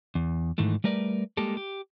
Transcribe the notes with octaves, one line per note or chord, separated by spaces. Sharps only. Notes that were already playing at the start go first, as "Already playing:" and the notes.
E2
G#2 D#3 E3 A3
G3 A3 A#4 B4 D5
G3 G#3 A#3 G4 A4
G4